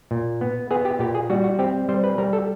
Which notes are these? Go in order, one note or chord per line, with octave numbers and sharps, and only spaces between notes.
A#2
B3
B3 G#4
G4
A#2 G4
G#4
G3 F#4
F#4
C4 G4
G3 C5
B4
G3 A#4
A4